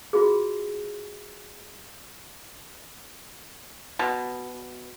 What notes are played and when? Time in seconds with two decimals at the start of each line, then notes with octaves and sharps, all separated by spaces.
0.13 F4 F#4 G#4
3.99 B2